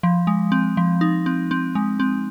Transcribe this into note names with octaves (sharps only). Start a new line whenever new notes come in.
F3
G#3
C4
F3
D#4
C4
C4
G#3
C4